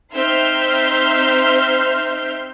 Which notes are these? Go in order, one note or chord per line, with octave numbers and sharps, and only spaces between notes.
C4 D#4 E5 C6 F6 G6